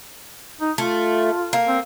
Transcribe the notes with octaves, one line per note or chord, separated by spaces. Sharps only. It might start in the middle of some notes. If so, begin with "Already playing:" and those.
D#4
A3 F4
A#3
C4